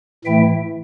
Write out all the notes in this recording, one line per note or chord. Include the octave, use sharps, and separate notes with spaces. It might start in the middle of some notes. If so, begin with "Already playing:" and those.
A2 E3 A3 E4 E5 G5